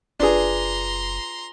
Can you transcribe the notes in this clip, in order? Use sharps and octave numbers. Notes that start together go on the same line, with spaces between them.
F#1 D4 F4 G#4 B4 D5 A#5 C6